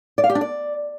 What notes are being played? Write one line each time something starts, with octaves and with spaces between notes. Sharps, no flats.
D5
F5
G4
D4
D5